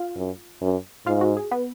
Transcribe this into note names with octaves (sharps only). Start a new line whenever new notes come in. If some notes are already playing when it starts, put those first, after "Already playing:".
Already playing: F4 F5
F#2
F#2
G#2 F4 F5
F#4
G#4
B3 B4